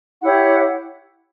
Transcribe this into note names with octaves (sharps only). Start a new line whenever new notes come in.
E4 G4 C#5 F#5